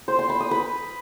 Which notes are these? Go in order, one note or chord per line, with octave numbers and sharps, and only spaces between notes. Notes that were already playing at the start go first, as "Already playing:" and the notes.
C5
C6
B5
D#6
B4